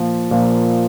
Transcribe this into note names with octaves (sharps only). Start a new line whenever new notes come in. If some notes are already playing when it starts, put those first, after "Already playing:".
Already playing: A#2 F3 A#3
A#2 F3 A#3